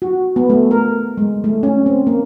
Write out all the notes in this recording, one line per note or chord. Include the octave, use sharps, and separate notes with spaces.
F#4
B3
A3
A#4
G#3
A3
C#4
C4
A#3